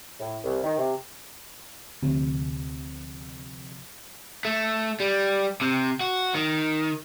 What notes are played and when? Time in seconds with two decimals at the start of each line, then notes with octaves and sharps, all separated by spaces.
0.20 A2
0.44 C2
0.64 D#3
0.78 C3
2.03 D2 C3 F3
4.45 A3
5.00 G3
5.61 C3
6.01 F#4
6.34 D#3